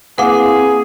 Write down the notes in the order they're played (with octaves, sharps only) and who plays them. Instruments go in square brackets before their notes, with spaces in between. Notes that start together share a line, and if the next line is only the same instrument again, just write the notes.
[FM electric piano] A#3 E4 F5 [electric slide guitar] C4 B4 [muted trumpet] G#4 [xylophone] F#5 D6